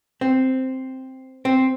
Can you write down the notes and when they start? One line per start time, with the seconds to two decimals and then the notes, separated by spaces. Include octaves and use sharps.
0.21 C4
1.45 C4